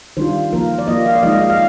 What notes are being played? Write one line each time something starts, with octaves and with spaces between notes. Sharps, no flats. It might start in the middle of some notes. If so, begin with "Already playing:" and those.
D#3 G3 D4 F4 C5
F3 A#3 F4 A#4
D5
F3 A#3 F4 D#5
F5
D5
F3 G#3 D#4 D#5
F5
D#5
F5